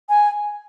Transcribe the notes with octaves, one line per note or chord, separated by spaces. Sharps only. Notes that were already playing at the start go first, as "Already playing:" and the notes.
G#5